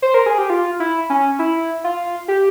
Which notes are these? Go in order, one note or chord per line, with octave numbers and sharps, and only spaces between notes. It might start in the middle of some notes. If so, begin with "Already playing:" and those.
C5
A#4
G#4
G4
F4
E4
C#4
E4
F4
G4